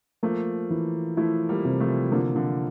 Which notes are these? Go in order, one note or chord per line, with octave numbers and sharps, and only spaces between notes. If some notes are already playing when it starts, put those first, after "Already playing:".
F3 A3 A#3
E3
F3 A3 E4
G3 A#3
C3
F3 A3
D3 F3 A#3
D3 F3